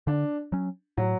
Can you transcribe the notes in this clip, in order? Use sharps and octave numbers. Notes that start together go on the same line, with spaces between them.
D3 D4
F#3 C#4
A2 F#3